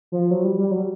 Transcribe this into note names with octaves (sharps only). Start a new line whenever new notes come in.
F3
F#3
G3
G3
F#3